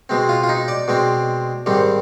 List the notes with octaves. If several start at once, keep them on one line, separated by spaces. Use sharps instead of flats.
B2 G#3 C4
F4
F4
D#4
D5
B2 G#3 C4
G#2 D#3 G3 C4